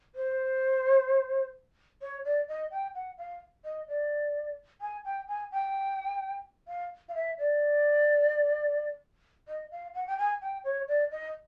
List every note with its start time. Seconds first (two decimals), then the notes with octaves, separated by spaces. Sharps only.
0.15 C5
2.02 C#5
2.25 D5
2.48 D#5
2.71 G5
2.95 F#5
3.18 F5
3.65 D#5
3.88 D5
4.81 G#5
5.05 G5
5.28 G#5
5.52 G5
6.68 F5
7.09 F5
7.15 E5
7.39 D5
9.48 D#5
9.71 F5
9.94 F#5
10.07 G5
10.18 G#5
10.42 G5
10.64 C#5
10.88 D5
11.11 D#5